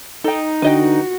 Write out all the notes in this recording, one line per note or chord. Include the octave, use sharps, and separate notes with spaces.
D#4 A4 G5
D3 F#4 B4 D#5 G5